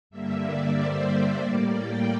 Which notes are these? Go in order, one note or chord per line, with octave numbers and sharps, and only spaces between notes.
G2 D3 G3 A#3 E5
D5
C5
D5
A2 G3 A#3 D5
G5